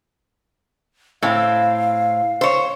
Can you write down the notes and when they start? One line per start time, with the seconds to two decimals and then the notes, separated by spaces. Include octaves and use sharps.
1.22 A2 C4 F5
2.41 C5 C#5